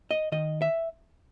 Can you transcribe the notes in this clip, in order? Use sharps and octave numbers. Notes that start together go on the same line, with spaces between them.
D#5
D#3 D#5
E5